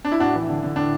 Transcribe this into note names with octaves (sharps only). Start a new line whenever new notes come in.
D4
E4
A2 D4 F#4
E3
D3
D3
A2 D4